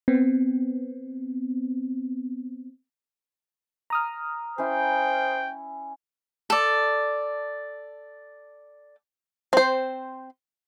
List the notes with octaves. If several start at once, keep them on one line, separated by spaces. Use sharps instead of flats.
B3 C4
A#5 D#6 F6
C#4 E4 C5 G5
A4 D5
C4 C5